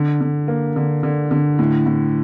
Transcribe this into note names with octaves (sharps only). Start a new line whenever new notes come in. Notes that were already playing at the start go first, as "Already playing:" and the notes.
Already playing: D3
D3
A#3
D3
D3
D3
A2
A2